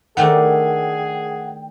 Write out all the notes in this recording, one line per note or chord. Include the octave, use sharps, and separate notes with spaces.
D#3 A3 D4 G#4 F#5 G5